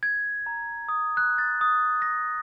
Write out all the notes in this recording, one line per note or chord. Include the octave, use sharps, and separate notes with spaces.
G#6
A#5
D#6
F#6
A6
D#6
A#6